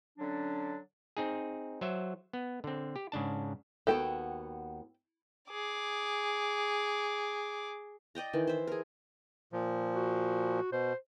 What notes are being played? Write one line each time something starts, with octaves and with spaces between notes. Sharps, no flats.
D3 F#3 C#4 D4
C4 D#4 G#4
F#3 C5 E5
B3
D3 C4
G4
G#2 C#3 D4 A5
D#2 B3 F#4 A4 G5
G#4 D6
D5 D#5 G5 A#5
D#3 E3
C5 E5
G#4 A#4
A#2 F3
F#4
B2 C5